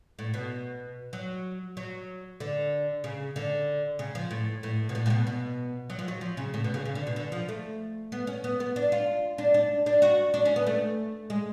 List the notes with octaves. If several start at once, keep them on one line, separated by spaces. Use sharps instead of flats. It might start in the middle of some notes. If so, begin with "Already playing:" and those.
A2
B2
F#3
F#3
D3
C#3
D3
C#3
F3
A2
A2
B2
A2
A2
B2
B2
F#3
F3
F#3
F3
C#3
A2
B2
C#3
C#3
D3
B2
D3
F3
A3
B3
C#4
B3
B3
D4
F4
D4
D4
D4
F#4
D4
C#4
B3
A3
G#3